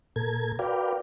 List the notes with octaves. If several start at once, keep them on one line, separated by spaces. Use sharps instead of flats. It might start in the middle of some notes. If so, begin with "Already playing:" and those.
A#2 A4 A#4 G#6
F#4 A#4 B4 D5 F5 G5